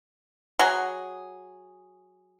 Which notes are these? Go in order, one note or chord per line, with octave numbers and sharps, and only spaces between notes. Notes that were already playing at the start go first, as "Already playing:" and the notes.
F#3 G#4